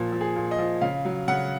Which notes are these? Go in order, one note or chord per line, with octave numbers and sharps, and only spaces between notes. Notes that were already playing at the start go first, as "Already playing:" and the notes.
Already playing: A#2 F3
F3
G#4
A#2
D#5
F3
C#3 F5
F#3
C#3 F#5